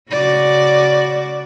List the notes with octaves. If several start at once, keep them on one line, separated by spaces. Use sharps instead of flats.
C#3 F#4 D5